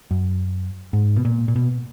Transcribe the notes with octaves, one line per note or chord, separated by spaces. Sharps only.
F#2
G#2
B2
A#2
A#2
B2